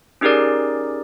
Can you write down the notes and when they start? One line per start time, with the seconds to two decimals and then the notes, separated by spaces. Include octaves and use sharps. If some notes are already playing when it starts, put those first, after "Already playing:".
0.21 C#4 D#4 G4 G#4 A#4 D5